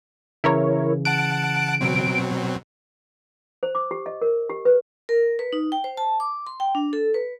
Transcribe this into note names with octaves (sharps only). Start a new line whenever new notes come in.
C#3 E3 E4 A#4 C#5
F#5 A5 F#6 D7
B2 F#3 C4
C5
D6
G4
D#5
A#4
G4
B4
A#4
B4
D#4
G5
C5
A5
D6
C6
G5
D4
A4
B4